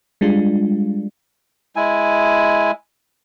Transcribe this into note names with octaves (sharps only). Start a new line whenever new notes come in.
G3 G#3 D4 F4
G#3 E4 G#5